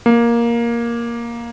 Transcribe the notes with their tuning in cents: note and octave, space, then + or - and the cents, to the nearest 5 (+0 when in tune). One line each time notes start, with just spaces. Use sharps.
A#3 +10